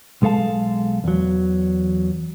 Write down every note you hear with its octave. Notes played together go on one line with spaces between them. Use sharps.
B1 G#3 A4 F5 A5
E2 F#3